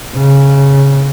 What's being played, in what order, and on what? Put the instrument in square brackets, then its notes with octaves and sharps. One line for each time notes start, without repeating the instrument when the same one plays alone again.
[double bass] C#3